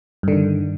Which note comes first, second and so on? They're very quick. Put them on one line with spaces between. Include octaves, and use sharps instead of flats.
G2 D3 D#3